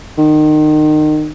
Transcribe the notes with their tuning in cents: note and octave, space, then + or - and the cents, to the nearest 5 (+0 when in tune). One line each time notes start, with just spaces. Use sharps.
D#3 -30